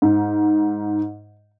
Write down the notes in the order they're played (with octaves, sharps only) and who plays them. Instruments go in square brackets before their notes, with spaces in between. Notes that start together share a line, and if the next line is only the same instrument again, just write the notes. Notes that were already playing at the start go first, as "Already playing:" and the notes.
[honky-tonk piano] G#2